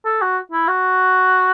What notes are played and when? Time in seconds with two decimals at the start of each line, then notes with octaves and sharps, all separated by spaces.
0.06 A4
0.22 F#4
0.52 E4
0.68 F#4